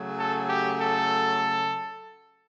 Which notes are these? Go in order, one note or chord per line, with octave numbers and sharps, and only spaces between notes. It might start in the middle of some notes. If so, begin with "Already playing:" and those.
Already playing: C#3 F#3 A3
A4
G4
A4